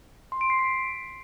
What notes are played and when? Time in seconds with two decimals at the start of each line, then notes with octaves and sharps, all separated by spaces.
0.32 C6
0.41 D7
0.50 C7
0.59 B6